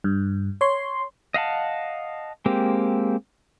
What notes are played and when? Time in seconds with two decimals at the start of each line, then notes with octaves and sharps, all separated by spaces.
0.04 G2
0.61 C#5 C6
1.34 D#5 F5 F#5 A5
2.46 G#3 A#3 C4 G4